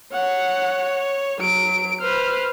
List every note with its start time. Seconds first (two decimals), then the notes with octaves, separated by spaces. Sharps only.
0.13 C#5 F#5
1.41 F#3 D7
2.02 B4 C5 F6